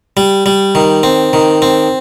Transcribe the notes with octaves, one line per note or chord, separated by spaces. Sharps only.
G3
G3
D#3
C4
D#3
C4